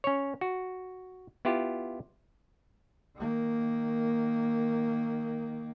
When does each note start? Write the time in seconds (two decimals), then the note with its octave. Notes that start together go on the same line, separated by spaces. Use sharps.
0.04 C#4 C#5
0.41 F#4
1.45 B3 E4 F4 G4
3.17 D#3 A#3